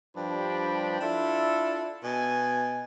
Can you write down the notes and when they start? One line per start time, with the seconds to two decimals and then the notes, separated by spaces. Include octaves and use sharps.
0.16 G2 F3 G3 D4 G5 B5
1.01 D4 E4 F4 A4
2.04 B2 G#5